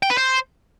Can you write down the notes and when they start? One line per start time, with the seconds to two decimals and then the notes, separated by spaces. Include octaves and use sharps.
0.03 G5
0.10 B4
0.17 C5